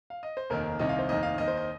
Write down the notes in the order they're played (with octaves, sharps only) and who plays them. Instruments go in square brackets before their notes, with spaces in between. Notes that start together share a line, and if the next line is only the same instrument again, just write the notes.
[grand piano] F5
D#5
C5
F1 D#2 D#3 A#4
C2 C3 D#3 D#5
F5
C5
F1 D#2 D#3 D#5
F5
D#2 D#3 D#5
C5
D#5